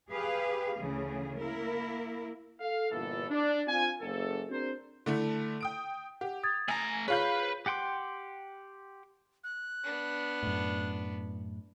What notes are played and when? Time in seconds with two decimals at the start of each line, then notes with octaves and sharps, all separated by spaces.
0.11 G4 G#4 B4 F5
0.77 D2 C#3 E3 A3 G#4
1.38 A#3 E4 A#4
2.61 A4 F5
2.91 G1 A#2 E3 A4
3.30 D4
3.68 C4 F4 G#5
4.01 F#1 A4
4.49 C4 D4 F#4 G#4 A#4 C5
5.06 D3 A3 E4
5.61 G5 D#6 D7
6.21 G4 F#5
6.43 D#6 G#6 A6
6.68 A3 G#5 A#5
7.08 F4 G#4 B4 C#5 F5 B5 G6
7.66 G4 F#5 G5 C6 D6
9.44 F#6
9.84 B3 D4
10.43 F#2 A2